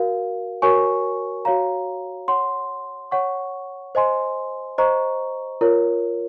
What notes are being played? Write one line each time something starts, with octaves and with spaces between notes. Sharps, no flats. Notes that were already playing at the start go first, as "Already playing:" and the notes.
Already playing: F#4 A#4 F5
F#4 A#4 C#5 G#5 C#6
F#4 C#5 F5 A#5
C#5 F#5 C6
C#5 F#5 C#6
C5 D#5 G#5 C6
C5 D#5 A#5 C#6
F4 A#4 C#5